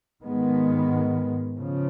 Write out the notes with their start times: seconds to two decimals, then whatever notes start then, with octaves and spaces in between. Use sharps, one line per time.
0.22 G#2 D#3 G#3 B3
1.57 C#3 F3